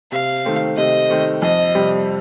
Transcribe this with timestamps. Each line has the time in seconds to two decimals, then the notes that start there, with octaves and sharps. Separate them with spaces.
0.12 C3 F5
0.45 D#3 A3 C4
0.77 C3 D#5
1.10 D#3 A3 C4
1.42 F2 D#5
1.75 C3 G3